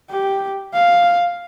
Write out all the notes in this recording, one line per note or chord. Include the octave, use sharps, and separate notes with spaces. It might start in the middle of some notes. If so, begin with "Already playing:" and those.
G4
F5